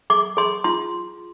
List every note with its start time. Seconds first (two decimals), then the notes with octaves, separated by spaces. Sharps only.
0.10 G#4 D6
0.37 G#4 C6
0.64 F4 C6